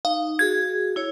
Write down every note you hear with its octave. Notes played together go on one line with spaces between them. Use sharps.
D#4 F5
F#4 G#4 G#6
E4 C#5